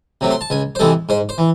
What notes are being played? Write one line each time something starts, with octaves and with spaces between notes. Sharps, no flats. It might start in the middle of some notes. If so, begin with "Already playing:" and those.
C3 F#3 A3
C6
A5
C#2 G#5
C5
C3 E3 G#3 A4
G#2 C5
C5
E3